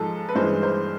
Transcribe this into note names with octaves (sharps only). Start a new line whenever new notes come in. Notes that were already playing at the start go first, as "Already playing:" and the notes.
Already playing: G#2 F3 G#3 A4
B4
G2 E3 G#3 C5
C5